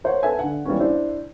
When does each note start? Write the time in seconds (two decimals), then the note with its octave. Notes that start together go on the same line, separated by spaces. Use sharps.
0.04 A#4 C5 C#5 F#5
0.23 A4 B4 E5 G#5
0.39 D3 F#5
0.65 E3 G3 A#3 B3 C#4
0.80 D4 E4 C5